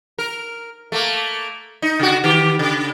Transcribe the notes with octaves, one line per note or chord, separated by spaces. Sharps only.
A#4
A3 A#3
D#4
C#3 F#4
D#3 G4
C#3